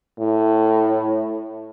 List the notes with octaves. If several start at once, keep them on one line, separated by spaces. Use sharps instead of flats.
A2